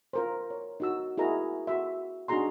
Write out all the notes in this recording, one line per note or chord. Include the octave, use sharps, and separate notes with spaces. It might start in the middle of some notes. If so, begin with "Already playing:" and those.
F4 A#4 C5
C#5
D#4 F#4 E6
E4 F#4 G#4 A#4 D#5 A#5
F#4 E5
D4 D#4 F#4 G#4 A#5 C6